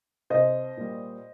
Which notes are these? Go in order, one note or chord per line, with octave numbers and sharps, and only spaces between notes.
C2 C5 D#5
A#2 G3